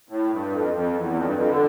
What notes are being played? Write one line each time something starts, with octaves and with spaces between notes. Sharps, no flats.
A2
G2
F2
F2
E2
F2
G2
F2
D3